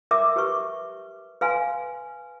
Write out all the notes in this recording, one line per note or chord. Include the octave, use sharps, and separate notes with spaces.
A#4 E5 D6 D#6
G4 B4 C#6
B4 F5 G#5 C6